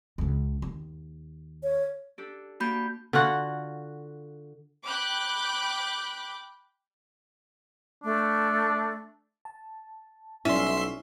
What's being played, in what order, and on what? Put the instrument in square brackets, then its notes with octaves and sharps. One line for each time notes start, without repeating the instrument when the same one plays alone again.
[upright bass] C#2 C#3
D#2
[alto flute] C#5
[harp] D4 G4 A4
[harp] A#3 D4 [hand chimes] F#4 B5 G6
[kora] D3 F4 F#4 F#5
[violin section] G5 B5 D6 F#6 G6
[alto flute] A3 [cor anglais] D4
[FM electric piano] A5
[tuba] B1 [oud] C#4 [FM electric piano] E4 [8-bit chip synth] E5 C6